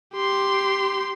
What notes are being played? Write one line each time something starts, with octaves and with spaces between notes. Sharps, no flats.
G4 C6